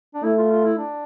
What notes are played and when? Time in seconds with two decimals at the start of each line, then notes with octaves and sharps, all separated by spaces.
0.14 D4
0.23 A3 E4
0.38 F4
0.51 F4
0.65 E4
0.78 D4